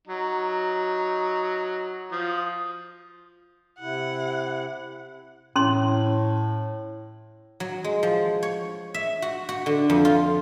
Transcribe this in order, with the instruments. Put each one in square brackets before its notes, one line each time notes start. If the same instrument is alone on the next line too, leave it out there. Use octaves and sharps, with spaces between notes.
[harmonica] F#3 D#4
F3 D#6
[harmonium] C3 E4 [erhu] F#5
[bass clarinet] A2 [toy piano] C#4 C6
[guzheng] F#3
G#3
F3
C#5
E5
F#4
F#4
D3
F2
F4